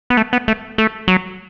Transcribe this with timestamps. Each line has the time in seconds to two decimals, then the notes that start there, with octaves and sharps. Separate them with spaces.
0.10 B3
0.17 A3
0.33 B3
0.48 A3
0.78 A3
1.08 F#3